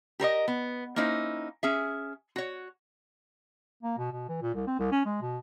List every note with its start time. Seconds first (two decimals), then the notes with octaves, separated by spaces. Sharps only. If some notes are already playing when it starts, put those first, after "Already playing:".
0.20 G4 A#4 C#5 D#5
0.48 B3
0.96 A#3 C#4 D#4 E4 C5
1.63 C#4 G#4 E5
2.36 F#4 C#5
3.83 A#3
3.98 B2
4.12 B2
4.28 E3
4.42 A#2
4.54 C2
4.67 C4
4.79 C2
4.91 C#4
5.05 G#3
5.21 B2